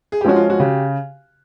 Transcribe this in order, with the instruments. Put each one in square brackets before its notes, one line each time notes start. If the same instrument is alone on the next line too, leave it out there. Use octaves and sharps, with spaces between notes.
[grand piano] G#4
G4
[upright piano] F3 G#3 C#4 [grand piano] F#4
[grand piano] F4
F#4
[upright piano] C#3 [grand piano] G4